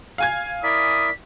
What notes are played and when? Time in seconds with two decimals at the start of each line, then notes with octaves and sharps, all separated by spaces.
0.18 F5 G#5 G#6
0.63 E4 A#4 D5 D#6 B6